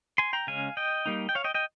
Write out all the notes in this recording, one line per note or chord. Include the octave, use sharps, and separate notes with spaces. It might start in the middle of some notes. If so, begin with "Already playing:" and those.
G#5 C6
G5 A#5
C#3 G#3 C#4 F5 G#5
D#5 G5
G3 A#3 D#4
G5
C#5 F5
D#5 G5
D#5 G5